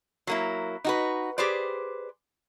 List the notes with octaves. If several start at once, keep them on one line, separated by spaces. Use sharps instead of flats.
F#3 A#3 E4
D#4 F#4 B4
G4 G#4 B4 C5 D5